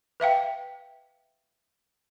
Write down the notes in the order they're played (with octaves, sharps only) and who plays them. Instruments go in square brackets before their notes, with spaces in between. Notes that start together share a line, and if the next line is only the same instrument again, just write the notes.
[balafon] B4 E5 F5 G5